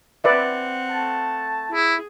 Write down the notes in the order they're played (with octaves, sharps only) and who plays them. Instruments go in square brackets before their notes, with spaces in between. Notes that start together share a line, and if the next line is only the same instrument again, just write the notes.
[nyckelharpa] C4 F#5 [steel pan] B4 D5 E5
[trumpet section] A3 A5
[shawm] E4 [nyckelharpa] G#4